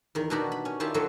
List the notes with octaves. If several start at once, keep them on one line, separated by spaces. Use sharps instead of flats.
E2 D#3
B2 D#3 D4 D#4 F#4 G4
B5
C#4
D#3 E4 F4 G4 D5 A5
D3 D#3 F3 F#3 F#4 A4